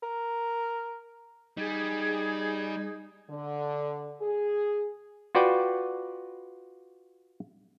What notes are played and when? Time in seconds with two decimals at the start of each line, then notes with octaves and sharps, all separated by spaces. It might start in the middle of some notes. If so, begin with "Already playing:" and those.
0.03 A#4
1.58 G3 D#4 G#4 G#6
3.30 D3
4.22 G#4
5.35 F4 F#4 B4 D5 G5